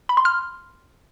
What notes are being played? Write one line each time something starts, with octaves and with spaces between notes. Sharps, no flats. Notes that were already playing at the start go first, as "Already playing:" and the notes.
B5
C6
F6